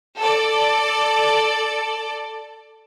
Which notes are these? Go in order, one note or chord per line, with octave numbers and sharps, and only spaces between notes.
A4 D5